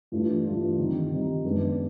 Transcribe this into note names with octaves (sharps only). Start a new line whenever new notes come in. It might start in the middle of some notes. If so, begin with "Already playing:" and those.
G2 E3 A3 D4 F4
G2 E3 A3 D4 F4
D#3 G3 C4 D#4
D#3 G3 C4 D#4
F#2 D#3 G#3 B3 D4